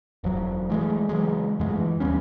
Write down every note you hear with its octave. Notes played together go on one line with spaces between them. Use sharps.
E1 F3 F#3
E3 F3 G#3 A3
C#3 E3 F#3 G#3
F2 D3 G#3 A3
E3
D#2 G3 B3 C#4